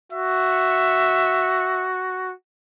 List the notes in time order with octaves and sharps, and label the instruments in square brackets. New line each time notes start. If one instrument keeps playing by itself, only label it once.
[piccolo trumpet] F#4 [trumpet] E5